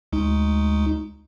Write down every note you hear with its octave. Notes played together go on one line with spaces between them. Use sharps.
D2 G#3 D#4